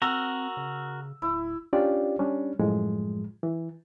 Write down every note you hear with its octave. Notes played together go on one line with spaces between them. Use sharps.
C4 F#4 A#4 E6
C#3
D1 E4
C#4 D4 F4 G4 D5
G3 C#4 D4
F#2 A2 F3 G#3
E3